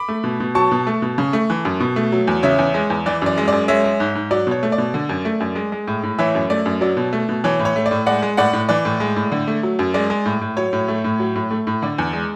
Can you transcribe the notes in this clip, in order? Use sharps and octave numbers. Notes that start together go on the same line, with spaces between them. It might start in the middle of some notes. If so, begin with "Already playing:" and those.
Already playing: B5 D6
A3
B2
B2
F#3 A5 C#6
B2
A3
B2
C#3
A3
E3
F#2
B2
A3
F#3
E2
C#3 C#5 E5
E2
G#3
E2
E3 D5
F#2 D5
G#3
F#2 D5
G#3 C#5 E5
G#3
G#2
G#2
F#3 D5
B2 C#5
A3
D5
B2
D3
F#2
A3
F#2
G#3
G#3
A2
A2
E3 C#5 E5
F#2
A3 D5
F#2
F#3 D5
B2
A3
B2
E3 C#5
A2
C#5
A3
D5
A2
G#3 D5 F#5
G#3
A2 D5 F#5
A2
E3 D5
A2
G#3
A2
D3
A3
F#3
F#2
G#3 D5
G#3
A2
A2
F#3 C#5
A2
A3
A2
F#3
A2
A3
A2
D3 D5
E2
G#3